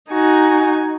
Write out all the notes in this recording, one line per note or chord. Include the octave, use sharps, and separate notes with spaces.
D#4 F#4 G#5